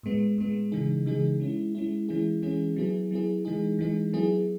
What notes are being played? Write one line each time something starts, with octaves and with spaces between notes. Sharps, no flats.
A2 G#3 B3
A2 G#3 B3
C#3 E3 G#3 D#4 G#4
C#3 E3 G#3 D#4 G#4
G#3 C#4 E4
G#3 C#4 E4
E3 G#3 C#4 E4 G#4
E3 G#3 C#4 E4 G#4
F#3 B3 E4 G#4
F#3 B3 E4 G#4
E3 G#3 D#4 G#4
E3 G#3 D#4 G#4
F#3 B3 E4 G#4